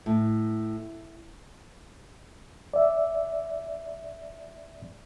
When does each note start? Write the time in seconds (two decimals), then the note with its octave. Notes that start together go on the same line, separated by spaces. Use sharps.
0.06 A2
2.74 D5 E5